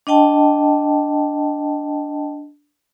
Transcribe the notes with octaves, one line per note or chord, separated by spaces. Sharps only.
D4 D#5 G5 A5